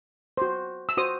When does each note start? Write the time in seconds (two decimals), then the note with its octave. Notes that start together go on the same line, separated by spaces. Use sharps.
0.37 F#4 C5
0.89 E6
0.97 F#4 C5 D#6